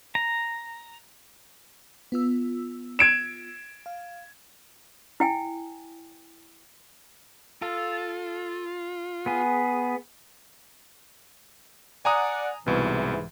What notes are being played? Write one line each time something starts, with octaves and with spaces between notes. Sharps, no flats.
A#5
B3 F4 E6
G#6 D7 E7
F5
E4 G5 G#5
F4 A4
B3 G#4
D5 F#5 G#5 A#5 D#6
C2 G#2 B2 E3